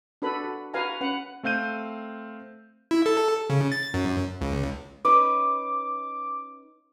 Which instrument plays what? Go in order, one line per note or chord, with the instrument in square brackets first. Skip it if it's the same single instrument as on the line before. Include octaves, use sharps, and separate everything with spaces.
[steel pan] D4 F#4 A4 B4 B5
F#4
F#4 B4 F5 G#5 A#5
C#4 B4 F#5
[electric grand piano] A3 C4 F5 G6 D#7
[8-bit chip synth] E4
A4
C#3
A6
F#2
C#2
[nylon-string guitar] C#4 D#4 B4 [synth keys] D6